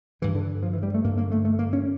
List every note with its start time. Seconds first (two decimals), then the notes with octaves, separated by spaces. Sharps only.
0.22 G2 D3 E3
0.35 D3
0.63 F3
0.73 E3
0.83 G3
0.94 A3
1.04 G2 A#3
1.07 D3
1.18 A#3
1.32 A3
1.45 A3
1.59 A#3
1.73 C#4